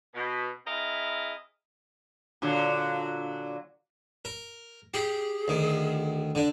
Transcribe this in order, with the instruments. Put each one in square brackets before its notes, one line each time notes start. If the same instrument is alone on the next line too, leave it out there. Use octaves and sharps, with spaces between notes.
[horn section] B2
C4 E4 G#4 D#5 F5 A#5
[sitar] A#2 D3 F#3
[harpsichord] A#4
[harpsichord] G4 [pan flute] G#4
[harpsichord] D2 D#3
D3 D4